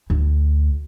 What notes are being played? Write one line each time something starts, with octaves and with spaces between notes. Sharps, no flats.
D2